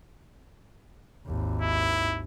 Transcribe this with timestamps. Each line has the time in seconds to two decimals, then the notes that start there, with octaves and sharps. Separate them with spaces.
1.27 G#1 D#2
1.62 E4